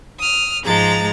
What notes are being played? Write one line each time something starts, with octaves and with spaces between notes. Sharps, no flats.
D#6 F6
G#2 F3 G#3 A#5 A6